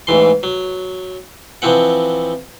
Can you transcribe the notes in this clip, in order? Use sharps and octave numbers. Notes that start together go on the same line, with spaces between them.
A1 G#2 E3 C6
F#3
E3 F3 C4 F#5